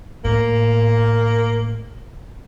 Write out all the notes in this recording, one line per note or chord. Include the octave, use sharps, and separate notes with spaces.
A2 A#3